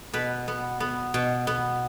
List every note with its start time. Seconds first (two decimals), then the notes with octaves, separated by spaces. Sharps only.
0.13 B2 B4
0.48 B3
0.80 B3
1.14 B2
1.47 B3